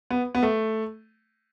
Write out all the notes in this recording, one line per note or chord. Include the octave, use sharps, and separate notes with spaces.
B3
B3
A3